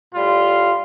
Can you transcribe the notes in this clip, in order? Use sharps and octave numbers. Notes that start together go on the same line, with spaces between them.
A2 G3 F4